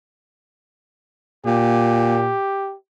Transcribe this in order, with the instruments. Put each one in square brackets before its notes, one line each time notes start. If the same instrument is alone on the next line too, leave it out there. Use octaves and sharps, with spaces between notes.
[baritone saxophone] A#2 [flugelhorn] G4